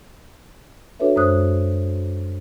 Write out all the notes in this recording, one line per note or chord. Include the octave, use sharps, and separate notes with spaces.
D4 F#4 A4 B4 C#5 E5
F#2 G#3 C5 D#6 F#6